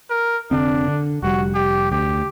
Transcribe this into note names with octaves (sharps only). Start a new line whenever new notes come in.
A#4
F1 D3 C4 D4
D3
F1 G3 F#4
G4
D2 G4